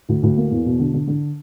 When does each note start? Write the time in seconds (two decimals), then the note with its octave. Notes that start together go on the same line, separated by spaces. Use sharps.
0.09 D2
0.23 D2
0.37 A#3
0.51 E2
0.65 B2
0.79 D3
0.94 D3
1.07 D3